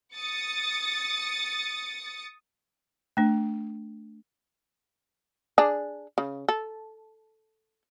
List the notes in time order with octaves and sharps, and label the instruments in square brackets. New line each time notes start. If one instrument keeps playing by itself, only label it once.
[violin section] D#6 A6 C#7
[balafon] A3 D4
[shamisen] D4 G#4
C#3
A4